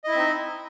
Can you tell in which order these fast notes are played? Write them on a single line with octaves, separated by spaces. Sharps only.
D#5 E4 E5 C4 D#4